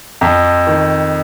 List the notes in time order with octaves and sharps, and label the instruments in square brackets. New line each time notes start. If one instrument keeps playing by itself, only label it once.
[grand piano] F2
D#3